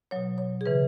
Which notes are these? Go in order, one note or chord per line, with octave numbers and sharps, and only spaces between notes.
B2 F#3 C#5
C#5
G#4
C#3 E3 B4